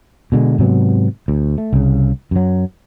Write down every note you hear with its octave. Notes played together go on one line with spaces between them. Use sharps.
B2 D3 G#3
G#2 C3 F#3 B3
D2
A3
C2 C#3
F#2 F#3